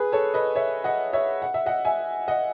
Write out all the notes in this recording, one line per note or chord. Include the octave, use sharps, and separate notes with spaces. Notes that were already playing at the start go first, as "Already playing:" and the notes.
Already playing: G#4 B4
A4 C#5
B4 D#5
C#5 E5
D#5 F#5
C#5 E5
F#5
E5
D#5 F#5
E5 G#5
D#5 F#5